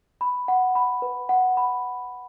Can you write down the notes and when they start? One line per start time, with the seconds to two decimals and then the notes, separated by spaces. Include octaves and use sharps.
0.21 B5
0.48 F#5
0.75 B5
1.02 B4
1.29 F#5
1.57 B5